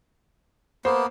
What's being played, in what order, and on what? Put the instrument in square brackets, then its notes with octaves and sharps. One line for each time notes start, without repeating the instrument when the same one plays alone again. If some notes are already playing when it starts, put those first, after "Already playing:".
[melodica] A#3 B3 [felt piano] C5